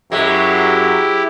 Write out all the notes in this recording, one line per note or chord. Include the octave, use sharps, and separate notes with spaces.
F#2 F#3 G#3 E4 G4